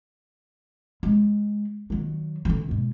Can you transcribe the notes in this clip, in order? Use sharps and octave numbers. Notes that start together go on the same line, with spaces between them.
G#3
D#3 F#3
D3 E3
G#2 B2